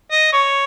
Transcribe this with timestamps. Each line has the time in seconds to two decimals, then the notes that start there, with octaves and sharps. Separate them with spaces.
0.11 D#5
0.33 C#5